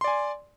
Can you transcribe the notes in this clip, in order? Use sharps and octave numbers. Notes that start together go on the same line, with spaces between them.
D5 G#5 C6